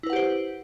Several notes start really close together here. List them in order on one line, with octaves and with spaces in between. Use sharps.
E4 B4 F#5 G4 C5